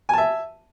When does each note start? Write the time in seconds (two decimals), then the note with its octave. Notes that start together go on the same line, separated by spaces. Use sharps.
0.09 G#5
0.13 A5
0.18 E5